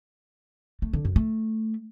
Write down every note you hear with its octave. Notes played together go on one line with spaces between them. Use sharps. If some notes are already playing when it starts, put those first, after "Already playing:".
A3
D3
F#2
A3